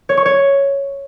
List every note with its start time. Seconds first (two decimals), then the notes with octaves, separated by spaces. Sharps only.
0.09 C#5
0.17 C#6
0.26 C#5